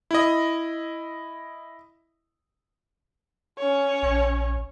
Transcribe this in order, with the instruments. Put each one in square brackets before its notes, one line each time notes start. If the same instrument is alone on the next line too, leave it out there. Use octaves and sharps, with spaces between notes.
[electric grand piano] E4 D#5
[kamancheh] C#4 C#5
[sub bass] A#1